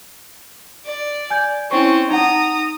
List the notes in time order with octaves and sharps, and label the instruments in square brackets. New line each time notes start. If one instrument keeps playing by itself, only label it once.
[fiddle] D5
[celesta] G#5 G6 G#6
[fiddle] C4 C#4 [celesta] E4 C#6
[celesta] D#4 F#5 [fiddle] A#5 D#6